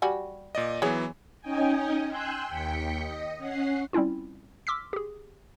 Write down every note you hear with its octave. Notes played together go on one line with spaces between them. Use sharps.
G3 F#4 G#5
A#2 D5 D#5
E3 F#3 B3 G#4 C#5
C#4 D#4 D#5 G5 G#5
G5 G#5 C6 E6 F#6 G6
D#2 G5 B6 C#7
D#5
C#4 F#5 C7
G3 C4 C#4 E4 F4
C6 D6 E6 F6 B6
G4 G#4